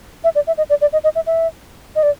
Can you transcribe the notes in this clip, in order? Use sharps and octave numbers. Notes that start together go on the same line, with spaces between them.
E5
D5
E5
D#5
D5
D5
D#5
D#5
E5
E5
D#5
D5